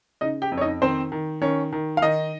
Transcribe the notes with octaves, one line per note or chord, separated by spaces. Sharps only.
C#3 D#4 D#5
G4 G5
F2
C#5
D#4 D#5
D#3 C4 C5
D#3
D#3 C#4 C#5
D#3
F5
D#3 D#4 D#5